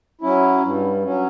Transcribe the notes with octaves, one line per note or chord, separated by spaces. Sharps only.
F#3 C#4 E4
G2
F#3 C#4